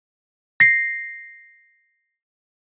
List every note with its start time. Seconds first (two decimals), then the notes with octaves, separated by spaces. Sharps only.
0.60 A#6 C7